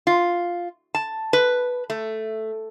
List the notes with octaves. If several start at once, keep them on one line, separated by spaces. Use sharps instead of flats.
F4
A5
B4
A3